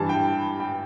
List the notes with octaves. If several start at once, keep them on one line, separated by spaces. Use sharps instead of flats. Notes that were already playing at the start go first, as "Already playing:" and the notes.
Already playing: G2 E3 A5
G5
G5